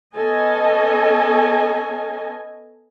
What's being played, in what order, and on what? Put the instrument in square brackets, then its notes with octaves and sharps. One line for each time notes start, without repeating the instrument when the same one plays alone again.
[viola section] B3 C#4 A4 D#5 G#5